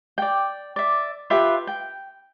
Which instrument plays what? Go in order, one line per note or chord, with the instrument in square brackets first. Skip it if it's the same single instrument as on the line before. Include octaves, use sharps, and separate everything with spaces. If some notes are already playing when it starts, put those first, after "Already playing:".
[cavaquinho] D5 G5
D5 E5
F4 G4 B4 E5
G5